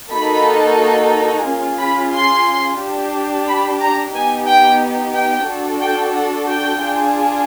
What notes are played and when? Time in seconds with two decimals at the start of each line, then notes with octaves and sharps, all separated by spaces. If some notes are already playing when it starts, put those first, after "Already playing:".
0.12 A#3 D#4 F#4 A4 B5
1.12 A#5
1.46 C#4 F4 G#4
1.79 B5
2.13 C6
2.79 D4 G4
3.46 B5
3.79 A#5
4.13 B3 D#4 G4 G#5
4.47 G5
5.14 G5
5.47 D4 F#4 A4
5.80 G5
6.14 F#5
6.47 G5
6.80 D4 F4 G#4